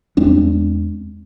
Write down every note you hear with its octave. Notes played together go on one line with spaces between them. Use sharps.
E2 G#3 C4 D4